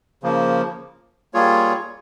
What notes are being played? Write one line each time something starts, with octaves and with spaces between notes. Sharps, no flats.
C#3 F3 A#3
G3 A#3 F4 G#4 C#5